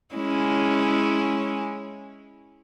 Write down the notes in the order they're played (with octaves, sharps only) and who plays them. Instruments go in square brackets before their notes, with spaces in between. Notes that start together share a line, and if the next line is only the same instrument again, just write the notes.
[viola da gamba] G#3 C#4 E4